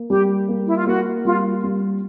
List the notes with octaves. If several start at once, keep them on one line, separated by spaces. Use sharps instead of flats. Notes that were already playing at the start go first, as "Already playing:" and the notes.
Already playing: A#3
G3 G4
A#3
E4
F4
A#3 F#4
G3 F4
G3